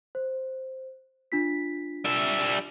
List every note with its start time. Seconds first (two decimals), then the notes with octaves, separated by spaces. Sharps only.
0.15 C5
1.32 D4 F4 B6
2.06 G3 E5